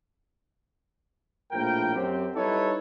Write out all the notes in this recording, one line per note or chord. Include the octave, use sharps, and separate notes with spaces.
A#1 A2 F3 A#4 G5
F#2 C4 G4
G3 D#4 E4 A4 B4 C#5